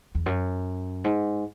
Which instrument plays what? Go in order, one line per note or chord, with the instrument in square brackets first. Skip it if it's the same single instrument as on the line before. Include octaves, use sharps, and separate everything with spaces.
[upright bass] E2
F#2
G#2